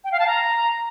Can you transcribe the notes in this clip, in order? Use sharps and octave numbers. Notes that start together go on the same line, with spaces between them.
G5
F5
A5
A#5